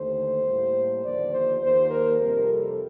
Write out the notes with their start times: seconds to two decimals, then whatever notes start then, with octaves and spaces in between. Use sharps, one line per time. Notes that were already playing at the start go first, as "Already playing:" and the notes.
Already playing: D#2 D3 A3 C5
0.44 A2 G3 A#3
1.03 D#2 D3 F3 A#3 D5
1.32 C5
1.61 D#2 D#3 A#3 C5
1.91 A#4
2.20 F2 C3 G3 A#4
2.49 A4